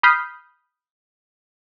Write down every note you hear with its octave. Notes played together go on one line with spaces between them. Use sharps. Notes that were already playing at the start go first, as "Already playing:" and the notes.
B5 D#6 F6 G6 B6 C7